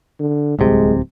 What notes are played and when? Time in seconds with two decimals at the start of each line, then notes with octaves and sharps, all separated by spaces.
0.20 D3
0.59 D1 C2 C3 G#3